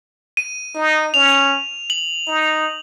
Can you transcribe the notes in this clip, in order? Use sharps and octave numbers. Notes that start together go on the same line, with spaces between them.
D#7
D#4
C#4 F7
F#7
D#4